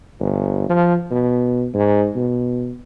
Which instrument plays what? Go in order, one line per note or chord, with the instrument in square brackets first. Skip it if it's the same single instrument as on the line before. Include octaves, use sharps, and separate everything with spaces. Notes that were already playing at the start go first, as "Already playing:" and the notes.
[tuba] G1
F3
B2
G#2
B2